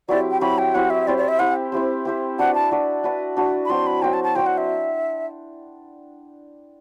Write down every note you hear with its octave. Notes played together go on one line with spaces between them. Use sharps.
F#3 C4 E4 G4 D5
G5
F#3 C4 E4 G4 B5
G5
F#3 C4 E4 G4 F#5
E5
C4 E4 G4 C5 D5
D5
E5
C4 E4 G4 C5 F#5
C4 E4 G4 C5
C4 E4 G4 C5
D4 F#4 B4 D5 F#5
A5
D4 F#4 B4 D5
D4 F#4 B4 D5
D4 F#4 B4 D5
B5
F#3 C4 F#4 C5 C6
B5
F#3 C4 F#4 C5 G5
A5
A5
F#3 C4 F#4 C5 G5
F#5
E5